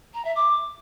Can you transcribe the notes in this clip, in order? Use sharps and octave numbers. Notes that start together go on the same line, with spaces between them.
A#5
E5
D6